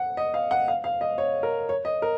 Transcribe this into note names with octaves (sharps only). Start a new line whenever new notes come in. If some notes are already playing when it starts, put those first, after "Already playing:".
Already playing: F#5
D#5
F5
F#5
F5
F5
D#5
C#5
A#4
C#5
D#5
A#4